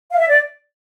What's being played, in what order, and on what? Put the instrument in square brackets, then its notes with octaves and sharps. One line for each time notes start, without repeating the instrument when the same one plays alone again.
[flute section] F5
E5
D5